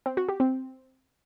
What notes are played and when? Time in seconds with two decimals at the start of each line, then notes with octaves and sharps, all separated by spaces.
0.06 C4
0.17 F#4
0.29 G4
0.40 C4